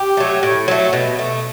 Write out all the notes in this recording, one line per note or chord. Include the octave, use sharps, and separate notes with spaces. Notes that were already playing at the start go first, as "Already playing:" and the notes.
Already playing: G4
F#3 A3
A2
F#3 A3
B2
A3